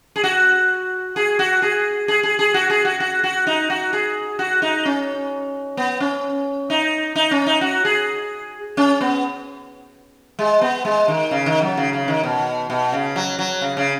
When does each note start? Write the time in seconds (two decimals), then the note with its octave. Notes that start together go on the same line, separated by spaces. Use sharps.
0.16 G#4
0.24 F#4
1.16 G#4
1.39 F#4
1.62 G#4
2.08 G#4
2.23 G#4
2.39 G#4
2.54 F#4
2.70 G#4
2.85 F#4
3.00 F#4
3.24 F#4
3.47 D#4
3.70 F#4
3.93 G#4
4.39 F#4
4.62 D#4
4.85 C#4
5.77 B3
6.00 C#4
6.70 D#4
7.16 D#4
7.31 C#4
7.46 D#4
7.61 F#4
7.85 G#4
8.77 C#4
9.01 B3
10.39 G#3
10.61 B3
10.85 G#3
11.08 D#3
11.31 C#3
11.46 D#3
11.62 F#3
11.77 C#3
11.93 C#3
12.08 D#3
12.23 B2
12.70 B2
12.92 C#3
13.16 F#3
13.39 F#3
13.61 C#3
13.77 C#3